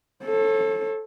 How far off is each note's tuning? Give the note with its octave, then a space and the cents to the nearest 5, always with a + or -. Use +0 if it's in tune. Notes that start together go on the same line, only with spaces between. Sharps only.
A4 +0 C#5 -45